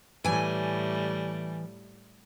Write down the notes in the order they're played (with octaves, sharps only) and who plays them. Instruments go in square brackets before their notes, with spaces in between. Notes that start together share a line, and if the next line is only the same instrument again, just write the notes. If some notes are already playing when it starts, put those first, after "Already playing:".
[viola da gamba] A2 G3 [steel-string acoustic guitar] E3 G#5